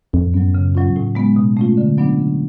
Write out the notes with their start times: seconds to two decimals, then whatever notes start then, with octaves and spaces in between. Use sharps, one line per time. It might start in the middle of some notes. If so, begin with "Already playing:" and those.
0.13 F2 A2
0.34 F#2 F#3 B3
0.54 C#3
0.75 F#3 C#4 F4
0.96 A2
1.15 G#3 B3
1.36 B2
1.57 A3 C#4 F4
1.77 D3
1.98 F#3 B3 D4
2.19 D3